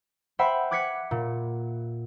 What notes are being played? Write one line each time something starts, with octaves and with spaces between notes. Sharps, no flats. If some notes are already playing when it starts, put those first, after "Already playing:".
C5 E5 F#5 G5 B5
D6 F#6 G#6 B6 C#7
A#2